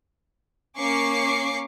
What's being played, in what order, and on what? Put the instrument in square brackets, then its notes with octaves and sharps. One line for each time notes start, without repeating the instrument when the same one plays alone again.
[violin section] A#3 C#4 C#6 D6 C7